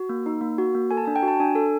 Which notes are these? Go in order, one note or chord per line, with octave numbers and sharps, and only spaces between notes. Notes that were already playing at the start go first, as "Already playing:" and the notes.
Already playing: F#4
A#3
D#4
A#3
F#4
A#3
A4 G#5
A5
D4 G#5
G5
F#4
A5
D4 G#5
A4